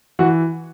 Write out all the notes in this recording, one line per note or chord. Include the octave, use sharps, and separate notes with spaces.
E3 F#4 F#5